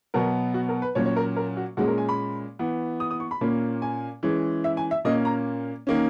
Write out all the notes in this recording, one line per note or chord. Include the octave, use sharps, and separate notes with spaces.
B2 F#3 B3 A#4
F#4
A#4
B4
A#2 F#3 C#4 C#5
C#5
A#4
A#4
F#4
A#2 G#3 C#4 F#4
A#4
G#5
B5
E3 B3
D#6
D#6
C#6
B5
A#2 A#3 C#4
G#5
E3 G#3 C#4
E5
G#5
E5
A#2 A#3 C#4 D#5
A#5
D#3 A#3 C#4